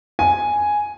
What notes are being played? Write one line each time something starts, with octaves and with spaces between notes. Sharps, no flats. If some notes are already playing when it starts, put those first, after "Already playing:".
G#5